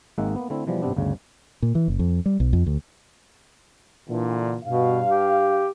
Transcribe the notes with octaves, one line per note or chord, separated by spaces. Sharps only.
G#1 G#3 A#3 D#4 E5 F#5
A#3 B3
D3 A3 C4 E4
B2 E3 F3 G3
A1 G2 C3 B3 C4 D4
G1 D2 C#3
A#2
E3
F#1
F2
G3
B1
F2
D2
A#2 D3 E3
G2 B2 F5
G4